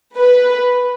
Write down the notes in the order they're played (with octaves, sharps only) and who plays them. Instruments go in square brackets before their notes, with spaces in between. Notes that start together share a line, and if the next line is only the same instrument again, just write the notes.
[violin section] B4